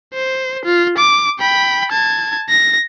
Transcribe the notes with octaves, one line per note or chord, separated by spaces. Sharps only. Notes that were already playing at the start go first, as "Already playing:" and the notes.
C5
F4
D6
G5 B5
A5 G#6
A#6